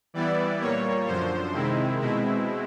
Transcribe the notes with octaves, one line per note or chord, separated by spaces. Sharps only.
E3 G3 B3 E4 D5
A#2 G3 A#3 C#5
F#2 D3 F3 C5
C3 D#3 G#3 C4 E4
B2 G#3 C4 E4